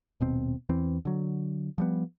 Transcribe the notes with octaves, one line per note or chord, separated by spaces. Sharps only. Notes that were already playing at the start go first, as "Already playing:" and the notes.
D#1 B2 C4
E2 E3 C4
D3 F#3
F3 G3 B3